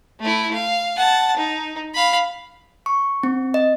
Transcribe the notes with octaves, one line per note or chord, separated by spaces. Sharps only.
A3 E4
F5
F#5 A5
D#4
F5 B5
C#6
C4
D#5